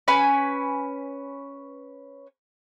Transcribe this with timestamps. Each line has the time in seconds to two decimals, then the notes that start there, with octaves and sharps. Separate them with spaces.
0.08 C#4 B4 G#5 B5